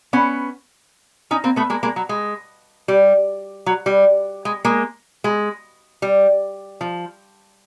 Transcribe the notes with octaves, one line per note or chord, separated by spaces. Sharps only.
B3 C#4
C#4 D#4
A#3 C4
A3 B3
G#3 A#3
G#3 A#3
F#3
G#3
G3
F#3
G3
G#3
G#3 A#3
G#3
G3
F3